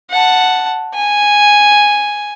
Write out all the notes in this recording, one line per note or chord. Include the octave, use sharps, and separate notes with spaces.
F#5 A5
G#5